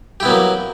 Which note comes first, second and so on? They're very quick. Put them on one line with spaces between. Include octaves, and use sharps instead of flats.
G4 E4 B3 F#3 A#3